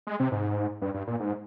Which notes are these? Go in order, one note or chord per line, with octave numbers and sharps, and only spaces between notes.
G#3
C3
G#2
G2
G2
A#2
G#2